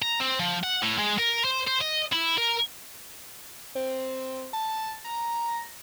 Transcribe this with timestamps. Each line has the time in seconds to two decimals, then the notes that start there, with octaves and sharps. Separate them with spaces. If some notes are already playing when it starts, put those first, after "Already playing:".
0.02 A#5
0.20 C4
0.40 F3
0.64 F#5
0.83 A2
0.98 G#3
1.19 A#4
1.45 C5
1.68 C5
1.81 D#5
2.13 E4
2.38 A#4
3.75 C4
4.53 A5
5.05 A#5